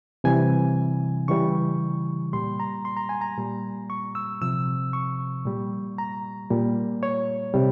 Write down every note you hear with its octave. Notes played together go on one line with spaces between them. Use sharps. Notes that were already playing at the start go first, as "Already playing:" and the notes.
C3 E3 G3 G#5
C#3 E3 G3 C#6
A#2 G3 C6
A#5
C6
A#5
G#5
A#5
A#2 G3
C#6
E6
C3 F3 E6
C#6
A#2 G3
A#5
A#2 G3
C#5
C3 G3